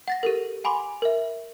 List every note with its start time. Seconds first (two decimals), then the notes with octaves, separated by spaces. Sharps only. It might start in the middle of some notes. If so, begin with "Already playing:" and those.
0.08 F#5 A6 A#6
0.23 G4 A4 A#4
0.64 F#5 G#5 B5 C6 D6
1.02 A#4 E5